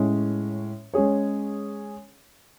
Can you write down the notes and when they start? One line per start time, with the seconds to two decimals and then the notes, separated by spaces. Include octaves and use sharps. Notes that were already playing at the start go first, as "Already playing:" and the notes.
Already playing: A2 G#3 C#4
0.94 G#3 C#4 G#4 C#5